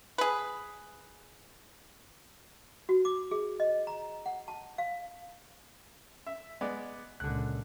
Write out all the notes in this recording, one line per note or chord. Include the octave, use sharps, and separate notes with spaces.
G#4 B4
F#4
D6
G#4
D#5
A#5
F#5
A5
F5
E5
G#3 B3 D5
C#2 A#2 D3 F#6